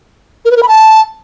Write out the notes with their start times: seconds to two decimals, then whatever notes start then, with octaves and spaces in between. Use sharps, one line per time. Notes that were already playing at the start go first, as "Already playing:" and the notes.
0.45 A#4
0.51 B4
0.57 A#4
0.63 B5
0.68 A5